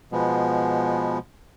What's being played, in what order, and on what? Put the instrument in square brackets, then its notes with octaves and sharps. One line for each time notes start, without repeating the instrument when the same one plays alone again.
[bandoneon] B2 F3 G#3 B3